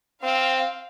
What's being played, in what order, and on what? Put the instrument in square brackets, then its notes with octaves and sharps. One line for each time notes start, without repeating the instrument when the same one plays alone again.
[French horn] C4 [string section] F5